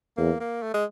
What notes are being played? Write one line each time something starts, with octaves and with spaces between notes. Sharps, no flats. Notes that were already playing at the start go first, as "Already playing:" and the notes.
E2 A#3
A#3
A3
G#3